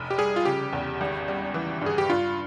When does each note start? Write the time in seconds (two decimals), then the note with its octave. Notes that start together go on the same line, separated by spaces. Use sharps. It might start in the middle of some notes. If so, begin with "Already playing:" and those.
Already playing: F1
0.10 G4
0.18 G3 G#4
0.36 F4
0.45 C#3 G4
0.73 E2
1.01 G#1
1.28 G3
1.54 E3
1.81 G2 G#4
1.98 G4
2.09 G2 F4